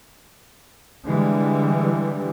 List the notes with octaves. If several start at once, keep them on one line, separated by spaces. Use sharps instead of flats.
D3 E3 G3 G#3